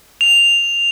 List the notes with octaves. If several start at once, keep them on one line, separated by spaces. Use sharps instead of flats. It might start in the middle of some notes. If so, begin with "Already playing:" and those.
F7